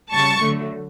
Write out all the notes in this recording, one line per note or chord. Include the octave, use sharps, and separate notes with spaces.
C#3 G3 A5 C#6
D3 F#3 A3